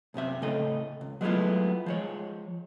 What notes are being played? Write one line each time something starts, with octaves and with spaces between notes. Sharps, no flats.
B1 F#2 C3 E5
A2 C#3 C4 A4 D#5
C#2
F#3 G#3 A3 B3 E4 F4
F3 G#3 C#5